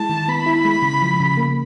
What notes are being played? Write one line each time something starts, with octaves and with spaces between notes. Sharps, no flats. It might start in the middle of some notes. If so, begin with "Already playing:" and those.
Already playing: G#3 E4 A5
D#3
B3 B5
E4
G#3
C#3
F3
C#3
A#3